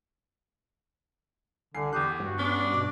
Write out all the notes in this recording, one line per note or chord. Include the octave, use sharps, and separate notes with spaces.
C2 D3 G#5 C7
E2 G4 D#6 F#6
G2 F#4
B3 C#4 D4
B2 D6